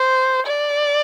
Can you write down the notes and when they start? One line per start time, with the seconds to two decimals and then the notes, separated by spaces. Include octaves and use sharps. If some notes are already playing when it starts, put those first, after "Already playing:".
Already playing: C5
0.46 D5